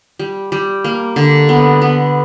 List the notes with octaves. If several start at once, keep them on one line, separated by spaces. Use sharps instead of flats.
G3
G3
A#3
D3
B3
B3